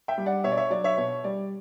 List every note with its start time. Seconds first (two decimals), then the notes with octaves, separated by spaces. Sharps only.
0.08 E5 G5
0.18 G3
0.26 D5 F#5
0.44 B2 C#5 E5
0.52 D5
0.57 C#5 E5
0.70 F#3 D5
0.84 C#5 E5
0.98 B2 C#5
1.24 G3 D5